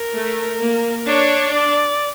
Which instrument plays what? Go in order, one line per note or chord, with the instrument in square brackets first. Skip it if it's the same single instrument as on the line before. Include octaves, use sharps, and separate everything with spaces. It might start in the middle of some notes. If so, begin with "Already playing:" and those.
Already playing: [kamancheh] A#4
[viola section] A3
A#3
[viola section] D4 [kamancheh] C#5
[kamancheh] D5